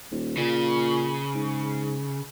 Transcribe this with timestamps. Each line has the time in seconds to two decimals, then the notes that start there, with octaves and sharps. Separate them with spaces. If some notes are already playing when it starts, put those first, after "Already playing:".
0.11 D#1
0.37 A#2 C#3
1.35 G#2